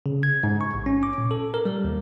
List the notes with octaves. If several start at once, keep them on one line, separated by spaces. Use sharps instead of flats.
C#3
G#6
G#2
C#6
A1
C#4
D6
A#2
A4
A#4
G3
D#2